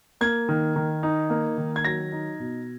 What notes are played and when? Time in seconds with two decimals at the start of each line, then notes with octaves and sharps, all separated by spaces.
0.21 A#3 G#6
0.49 D#3
0.76 D#3
1.03 D#4
1.30 A#3
1.58 D#3
1.76 G#6
1.85 F#3 A#6
2.12 D#4
2.39 B2